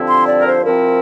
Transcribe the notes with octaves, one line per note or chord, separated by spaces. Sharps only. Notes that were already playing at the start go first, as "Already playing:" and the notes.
Already playing: G2 D3 F3 C4 E4
C6
D5
A#4
C5
C3 F3 C4 E4 A#4